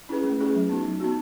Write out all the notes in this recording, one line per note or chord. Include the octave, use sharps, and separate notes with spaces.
C#4 E4 G#4 B4
A3
C#4 E4 G#4 B4
F#3
B3 D#4 F#4
F#3
B3 D#4 F#4